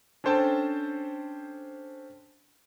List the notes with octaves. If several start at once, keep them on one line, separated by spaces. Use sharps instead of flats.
C#4 D4 A4 C5 G5 A5